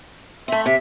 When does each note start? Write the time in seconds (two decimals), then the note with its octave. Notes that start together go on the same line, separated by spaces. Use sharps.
0.48 A3 C4 E5
0.66 C3 E5